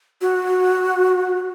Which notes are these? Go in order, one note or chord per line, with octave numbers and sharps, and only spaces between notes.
F#4